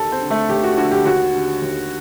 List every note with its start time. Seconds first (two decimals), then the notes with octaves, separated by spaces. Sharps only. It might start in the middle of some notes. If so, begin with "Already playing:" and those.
Already playing: D#2 A4 A5
0.12 C4 C5
0.21 D3
0.30 A3 A4
0.49 D#2 G4
0.63 F#4
0.77 D3 F#4
0.91 G4
1.05 D#2 F#4
1.33 D3
1.62 D#2